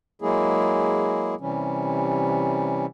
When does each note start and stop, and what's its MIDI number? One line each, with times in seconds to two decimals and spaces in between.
0.22 1.35 54
0.22 1.35 56
0.22 1.35 58
0.22 1.35 64
0.22 1.35 68
1.41 2.86 48
1.41 2.86 52
1.41 2.86 55
1.41 2.86 61